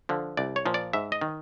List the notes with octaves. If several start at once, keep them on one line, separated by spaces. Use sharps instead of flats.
D3 F3
C2 D5
C#5
A#2 F3
D5
G#2 E5
D#5
D#3